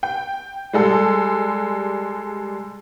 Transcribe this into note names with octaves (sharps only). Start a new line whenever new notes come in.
G5
G3 G#3 A4